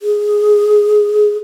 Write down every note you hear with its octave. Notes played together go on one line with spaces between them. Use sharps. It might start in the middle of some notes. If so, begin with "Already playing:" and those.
G#4